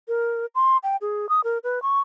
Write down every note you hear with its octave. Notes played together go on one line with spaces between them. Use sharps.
A#4
C6
G5
G#4
D#6
A#4
B4
C#6